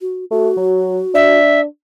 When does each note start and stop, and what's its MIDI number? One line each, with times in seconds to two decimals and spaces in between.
0.01 0.25 66
0.31 0.49 57
0.31 1.39 66
0.57 1.00 54
1.14 1.64 62
1.14 1.60 76